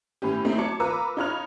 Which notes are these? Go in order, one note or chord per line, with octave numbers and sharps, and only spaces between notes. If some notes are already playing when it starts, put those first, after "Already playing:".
A2 E3 C#4 G4
A3 C4 D#4 E4
F#3 C#5 A5 D6 C#7
F4 A#4 B4 A#5 D6 E6
D#4 F4 C#5 B5 F6 F7